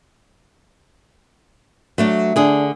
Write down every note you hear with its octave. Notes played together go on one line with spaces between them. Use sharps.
F#3 A3 D4
D3 D4 G#4